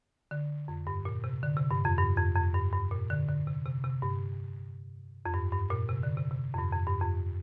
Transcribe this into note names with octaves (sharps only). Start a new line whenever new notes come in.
D3
F2
G2
A#2
C3
D3
C3
G2
F2
G2
F2
F2
G2
G2
A#2
D3
D3
C3
C3
C3
G2
F2
G2
G2
A#2
C3
D3
C3
C3
F2
G2
F2
G2
F2